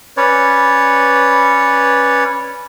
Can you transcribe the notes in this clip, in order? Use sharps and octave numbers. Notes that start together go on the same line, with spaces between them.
C#4 B4 C#5 D5